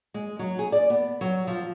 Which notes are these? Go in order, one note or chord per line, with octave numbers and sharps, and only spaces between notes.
G#3
F#3
G#4
D5
B3
F#3
F3